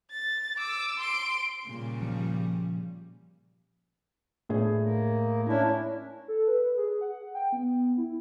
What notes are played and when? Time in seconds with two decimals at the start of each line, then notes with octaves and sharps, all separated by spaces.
0.11 A6
0.57 D6 E6
0.99 C6 D7
1.66 A#2 C#3 G3
2.02 F3
4.49 A2 D4 G#4
4.84 A#3
5.48 C#4 D4 E4
6.28 A4
6.48 B4
6.77 G#4
7.01 F#5
7.35 G5
7.53 B3
7.98 E4